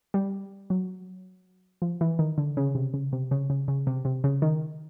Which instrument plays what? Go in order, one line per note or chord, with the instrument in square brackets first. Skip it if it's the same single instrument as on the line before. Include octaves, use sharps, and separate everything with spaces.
[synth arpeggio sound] G3
F#3
F3
E3
D#3
D3
C#3
C3
C#3
C3
C#3
C#3
C#3
C3
C3
C#3
D#3